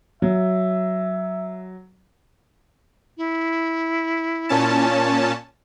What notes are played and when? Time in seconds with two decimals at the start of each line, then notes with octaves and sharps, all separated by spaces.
0.22 F#3 E5
3.18 E4
4.49 A#2 C#4 A5